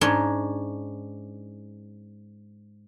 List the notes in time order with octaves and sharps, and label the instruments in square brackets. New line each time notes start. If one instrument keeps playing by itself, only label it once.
[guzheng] G#2 C#4 D4 C#5 C6